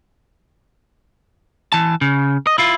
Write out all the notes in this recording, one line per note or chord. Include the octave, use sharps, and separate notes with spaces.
E3 A5
C#3
D#5
E4 F4